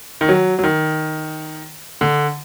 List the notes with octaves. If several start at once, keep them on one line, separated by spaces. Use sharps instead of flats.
D#3
F#3
F#3
D#3
D3